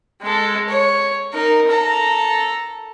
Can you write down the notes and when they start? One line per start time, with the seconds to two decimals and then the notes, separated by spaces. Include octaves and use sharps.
0.22 G#3 A4
0.69 C#5
1.33 D#4 A#4
1.69 A4 A#5